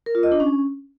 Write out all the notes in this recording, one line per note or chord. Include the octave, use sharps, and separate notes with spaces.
A#4
F4
D#5
D4
C#4